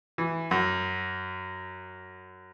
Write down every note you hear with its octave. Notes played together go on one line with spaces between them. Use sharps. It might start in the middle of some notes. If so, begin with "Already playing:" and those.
E3
F#2